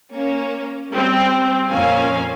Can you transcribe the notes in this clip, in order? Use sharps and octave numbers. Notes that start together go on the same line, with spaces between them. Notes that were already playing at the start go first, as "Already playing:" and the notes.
A#3 C#4
G3 C4
F2 A#2 A#3 C#4 F5 G#5